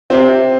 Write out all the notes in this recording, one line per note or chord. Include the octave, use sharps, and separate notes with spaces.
C3 C4